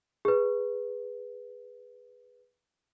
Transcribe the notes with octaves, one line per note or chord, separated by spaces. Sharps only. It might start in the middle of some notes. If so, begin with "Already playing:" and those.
G#4 B4